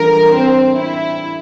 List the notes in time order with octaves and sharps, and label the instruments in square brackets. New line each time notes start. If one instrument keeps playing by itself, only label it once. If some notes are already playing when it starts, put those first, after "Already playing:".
Already playing: [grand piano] E3 G3 D4 F4 A4 [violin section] A#4
[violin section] C4
E4